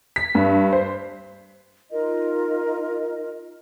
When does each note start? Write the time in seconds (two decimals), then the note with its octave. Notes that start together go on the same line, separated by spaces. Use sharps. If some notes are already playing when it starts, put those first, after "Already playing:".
0.16 B6
0.35 G2
0.72 C5
1.91 D#4 F4 A#4 D#5